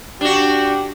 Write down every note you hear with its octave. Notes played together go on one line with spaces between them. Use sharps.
D4 F#4 G4